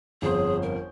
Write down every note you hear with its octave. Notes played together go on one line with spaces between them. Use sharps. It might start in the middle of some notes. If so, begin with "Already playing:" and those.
G1 F2 C#4 G#4 C5
A#4